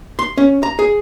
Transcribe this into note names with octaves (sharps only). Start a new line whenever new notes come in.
C6
C#4
A#5
G#4